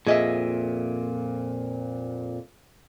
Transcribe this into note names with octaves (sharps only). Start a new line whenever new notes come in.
F2 A#2 G#4 D#5 E5